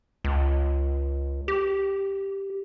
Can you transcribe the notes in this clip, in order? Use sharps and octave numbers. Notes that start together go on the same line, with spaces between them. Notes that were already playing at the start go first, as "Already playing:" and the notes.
C#2
G4